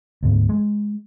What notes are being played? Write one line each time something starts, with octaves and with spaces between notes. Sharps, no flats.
D2 G#2 B3
G#3